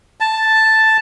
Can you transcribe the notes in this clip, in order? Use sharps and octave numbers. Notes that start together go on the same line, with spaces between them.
A5